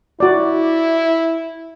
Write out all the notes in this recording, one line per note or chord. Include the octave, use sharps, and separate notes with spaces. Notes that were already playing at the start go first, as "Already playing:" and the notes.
E4 F#4 D5